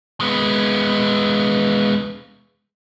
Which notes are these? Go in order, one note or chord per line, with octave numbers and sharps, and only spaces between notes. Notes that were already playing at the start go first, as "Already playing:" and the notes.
G#3 B3